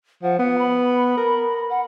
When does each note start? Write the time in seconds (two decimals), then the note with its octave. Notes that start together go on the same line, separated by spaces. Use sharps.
0.23 F3 F#5
0.39 B3 F#5
0.58 B5
1.17 A#4
1.70 F#5